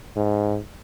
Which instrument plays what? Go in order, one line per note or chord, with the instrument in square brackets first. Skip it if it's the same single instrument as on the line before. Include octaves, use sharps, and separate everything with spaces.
[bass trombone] G#2